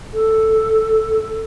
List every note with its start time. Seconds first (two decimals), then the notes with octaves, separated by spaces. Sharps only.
0.13 A4